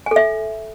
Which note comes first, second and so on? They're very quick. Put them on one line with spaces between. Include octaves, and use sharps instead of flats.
G#5 A4 E5